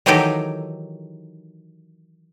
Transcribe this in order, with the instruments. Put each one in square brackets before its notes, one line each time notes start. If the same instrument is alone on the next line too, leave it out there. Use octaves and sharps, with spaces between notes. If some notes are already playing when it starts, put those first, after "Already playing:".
[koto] D#3 E3 F#3 D#4 G4 A4